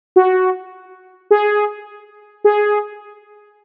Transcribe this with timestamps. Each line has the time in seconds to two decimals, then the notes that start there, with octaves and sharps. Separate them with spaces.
0.16 F#4
1.31 G#4
2.44 G#4